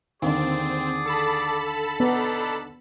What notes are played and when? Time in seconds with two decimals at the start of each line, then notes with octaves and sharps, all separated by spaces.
0.22 D#2 D3 C4 G#4 D5
1.06 A4 A5 B5
2.00 B3 D4 D#4